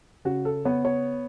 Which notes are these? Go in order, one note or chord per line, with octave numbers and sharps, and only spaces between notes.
C#3 F#4
A4
B3 C#5
C#5